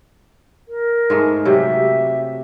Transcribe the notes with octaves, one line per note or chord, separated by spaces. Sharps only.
A#4
G#2 G#3 A3
C3 F#3 G4 E5